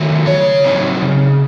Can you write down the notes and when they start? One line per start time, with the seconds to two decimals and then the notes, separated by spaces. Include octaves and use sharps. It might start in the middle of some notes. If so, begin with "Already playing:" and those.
Already playing: D#3 F#3 A3
0.27 C#3 C#5
0.64 F#3 C4 D#4
1.02 C#3